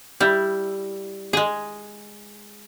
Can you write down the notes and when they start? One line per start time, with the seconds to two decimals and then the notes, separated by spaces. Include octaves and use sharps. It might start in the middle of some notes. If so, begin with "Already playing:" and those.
0.20 G3 E4
1.33 G#3 G#4